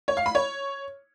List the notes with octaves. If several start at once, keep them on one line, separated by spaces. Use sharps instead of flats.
C#5
F5
B5
C#5